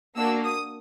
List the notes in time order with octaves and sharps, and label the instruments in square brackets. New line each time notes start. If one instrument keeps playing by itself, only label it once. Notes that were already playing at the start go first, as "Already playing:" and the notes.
[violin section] A#3 D4 F#4 E6
D#6